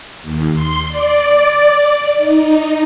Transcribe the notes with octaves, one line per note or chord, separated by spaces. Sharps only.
D#2
C6
D5
D#4